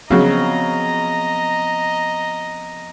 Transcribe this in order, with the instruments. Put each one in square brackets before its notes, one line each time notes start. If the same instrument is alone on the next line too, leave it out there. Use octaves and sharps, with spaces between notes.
[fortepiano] C#3 F#3 [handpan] F3 B3 C4 [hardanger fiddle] D#5 A#5